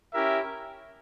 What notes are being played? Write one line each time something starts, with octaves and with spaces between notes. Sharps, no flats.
C#4 E4 G4 A#4 E5